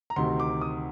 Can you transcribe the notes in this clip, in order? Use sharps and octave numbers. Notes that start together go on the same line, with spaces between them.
A#5
D2 C3 D#3 C6
D6
D#6